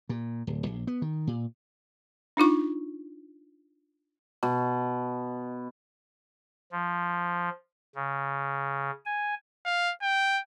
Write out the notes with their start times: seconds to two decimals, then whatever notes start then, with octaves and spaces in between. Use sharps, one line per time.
0.09 A#2
0.47 D1
0.66 A#1
0.87 B3
1.02 D#3
1.27 A#2
2.37 D4 D#4 F4 C#6
4.43 B2
6.72 F3
7.95 C#3
9.06 G#5
9.65 F5
10.02 G5